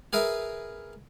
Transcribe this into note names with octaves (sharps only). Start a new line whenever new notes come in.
G#4 A#4 B4 E5